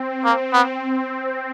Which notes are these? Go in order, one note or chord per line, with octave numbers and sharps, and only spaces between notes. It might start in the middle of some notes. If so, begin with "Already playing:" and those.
Already playing: C4
A#3
B3